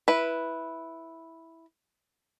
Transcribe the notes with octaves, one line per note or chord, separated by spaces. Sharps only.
E4 B4